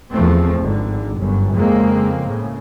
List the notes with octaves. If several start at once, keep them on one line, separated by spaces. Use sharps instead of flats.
E2 F3 A3 C4
G#1 D3
G1 F#2
F2 C#3 G#3 A#3 C4
A2 C#3